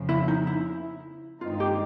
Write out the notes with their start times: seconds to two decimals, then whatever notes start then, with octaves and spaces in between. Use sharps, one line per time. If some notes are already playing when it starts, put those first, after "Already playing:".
Already playing: F2 C#3 F3
0.09 E4
0.28 D#4
0.47 E4
1.41 G2 D#3 G#3 C4 D#4 F4
1.60 G4